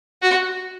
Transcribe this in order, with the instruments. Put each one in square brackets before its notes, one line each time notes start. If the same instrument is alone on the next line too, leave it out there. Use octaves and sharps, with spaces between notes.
[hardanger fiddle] F#4